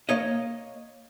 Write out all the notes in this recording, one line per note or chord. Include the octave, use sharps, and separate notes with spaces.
A#3 C#5 D#5